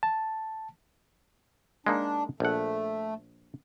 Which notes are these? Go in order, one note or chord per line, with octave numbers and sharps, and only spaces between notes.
A5
G#3 A#3 D4 D#4
A#1 A3 F#5